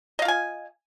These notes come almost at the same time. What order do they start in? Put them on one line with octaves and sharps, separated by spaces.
D#5 F5 F4 G#5